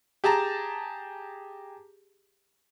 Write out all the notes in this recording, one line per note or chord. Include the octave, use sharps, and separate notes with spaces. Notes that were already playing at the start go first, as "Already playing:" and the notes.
G4 G#4 A5 A#5